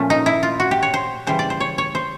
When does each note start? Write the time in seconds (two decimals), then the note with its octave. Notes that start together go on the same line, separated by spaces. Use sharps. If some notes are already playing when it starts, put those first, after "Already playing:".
Already playing: A#2 F3 A3 C#4
0.10 D#4
0.26 E4
0.43 F4
0.60 F#4
0.71 G4
0.83 C#5
0.94 C5
1.27 C#3 E3 G3 C5
1.39 D5
1.50 C5
1.60 C#5
1.78 C#5
1.95 C5